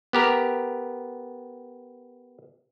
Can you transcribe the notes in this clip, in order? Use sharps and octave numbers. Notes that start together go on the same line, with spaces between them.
B3 G4 A#4